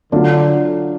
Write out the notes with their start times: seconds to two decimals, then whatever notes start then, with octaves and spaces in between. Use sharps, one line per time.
0.12 D3 F#3 A3 D4 F4